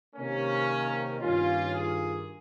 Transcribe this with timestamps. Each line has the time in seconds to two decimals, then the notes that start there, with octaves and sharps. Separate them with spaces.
0.16 C3 D#3 A#3 C#4
1.20 G2 D#3 A#3 C#4 F4
1.73 F4 G#4